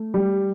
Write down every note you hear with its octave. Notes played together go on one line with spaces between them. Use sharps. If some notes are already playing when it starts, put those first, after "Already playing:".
Already playing: A3
G3